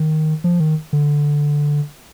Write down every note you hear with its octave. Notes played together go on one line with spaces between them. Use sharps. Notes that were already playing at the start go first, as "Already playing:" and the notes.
Already playing: D#3
F3
D#3
D3